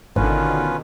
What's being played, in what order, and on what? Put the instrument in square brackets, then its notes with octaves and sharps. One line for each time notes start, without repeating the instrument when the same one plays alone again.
[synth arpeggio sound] G#1 [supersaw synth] B2 D3 D#3 [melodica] C#4 F4 B4